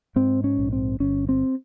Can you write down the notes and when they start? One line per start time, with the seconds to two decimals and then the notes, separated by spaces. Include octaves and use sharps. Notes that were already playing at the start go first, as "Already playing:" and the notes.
0.16 G#2 C4
0.44 C#4
0.58 A#1
0.73 C4
1.00 G1 C#4
1.29 C4